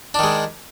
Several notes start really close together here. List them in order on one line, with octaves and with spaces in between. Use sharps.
D4 D#3 G#3